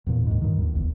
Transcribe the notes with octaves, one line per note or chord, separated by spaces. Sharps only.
E2 A#2
D#2 G#2
G2 D#3
D#2
D1 G1 E2